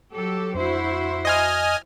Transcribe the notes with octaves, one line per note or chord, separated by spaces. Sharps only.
F#3 G4 A4
F2 D4 E4 F#4 C5
D#5 G#5 F6